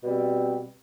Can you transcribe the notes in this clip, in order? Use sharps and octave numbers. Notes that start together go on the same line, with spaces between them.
B2 G3 C4